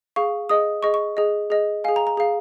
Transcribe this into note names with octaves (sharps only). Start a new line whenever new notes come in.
G#4 F5 C#6
G#4 D#5 D#6
G#4 D#5 C#6
C#6
G#4 D#5
G#4 D#5
G#4 F5 G#5
A#5
A#5
G#4 F5